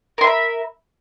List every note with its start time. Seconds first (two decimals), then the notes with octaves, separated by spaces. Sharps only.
0.18 A#4
0.21 C6
0.24 E5
0.27 B5